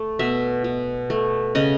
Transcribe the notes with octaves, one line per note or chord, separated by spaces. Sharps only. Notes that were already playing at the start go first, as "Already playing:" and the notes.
Already playing: A3
B2 E5
B2
A3
C#3 D#5